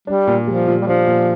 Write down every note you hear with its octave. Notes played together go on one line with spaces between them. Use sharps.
G3 D4
A#2
F3 G3
A#2
G3
F3 D4
A#2